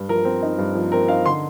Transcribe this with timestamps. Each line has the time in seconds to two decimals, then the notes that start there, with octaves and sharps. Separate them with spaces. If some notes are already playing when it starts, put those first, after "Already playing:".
Already playing: G2
0.09 F3 A#4
0.25 C4
0.43 D#4
0.58 G2
0.75 F3
0.92 C4 A#4
1.08 D#4 F5
1.26 D3 C6